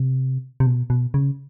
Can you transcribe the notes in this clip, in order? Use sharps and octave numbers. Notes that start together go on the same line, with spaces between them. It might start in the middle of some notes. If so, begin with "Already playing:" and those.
Already playing: C3
C3
B2
B2
C#3